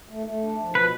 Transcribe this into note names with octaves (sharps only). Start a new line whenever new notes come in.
A3
A3
D4
F3
B2 B4